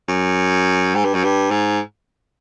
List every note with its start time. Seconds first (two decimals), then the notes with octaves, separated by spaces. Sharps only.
0.08 F#2
0.95 G#2
1.05 G2
1.14 F#2
1.24 G2
1.51 G#2